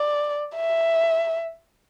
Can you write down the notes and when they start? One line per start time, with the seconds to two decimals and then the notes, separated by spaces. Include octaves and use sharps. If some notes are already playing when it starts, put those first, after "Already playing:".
Already playing: D5
0.56 E5